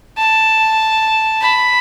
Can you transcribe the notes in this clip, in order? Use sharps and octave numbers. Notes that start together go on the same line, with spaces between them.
A5
B5